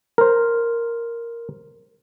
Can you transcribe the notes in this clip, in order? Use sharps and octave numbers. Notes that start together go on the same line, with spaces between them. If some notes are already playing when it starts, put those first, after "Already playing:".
A#4 C5